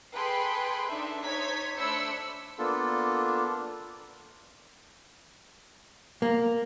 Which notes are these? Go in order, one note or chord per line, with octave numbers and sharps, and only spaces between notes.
G#4 A4 B4 G5 B5 C6
D4 D#4 A4 E5
D#4 C5 C#5 G#6 B6
A3 D4 C5 B5 E6 C#7
A#3 B3 D4 F4 A4
A#3